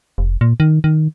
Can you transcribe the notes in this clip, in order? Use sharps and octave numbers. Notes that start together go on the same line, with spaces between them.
F1
A#2
D#3
D#3